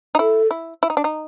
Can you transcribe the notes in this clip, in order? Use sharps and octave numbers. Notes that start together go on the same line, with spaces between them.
D#4
E4 A4
E4
E4
D#4
D4
D#4